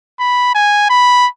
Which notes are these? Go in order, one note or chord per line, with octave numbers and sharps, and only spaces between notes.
B5
G#5
B5